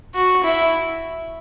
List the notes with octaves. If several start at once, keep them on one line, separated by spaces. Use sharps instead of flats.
F#4
E4